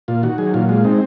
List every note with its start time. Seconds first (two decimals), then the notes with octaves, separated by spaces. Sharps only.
0.08 A#2 F4
0.23 D#3 F#4
0.38 F#3 G#4
0.54 A#2 F4
0.69 G#3 F4
0.84 C4 D#4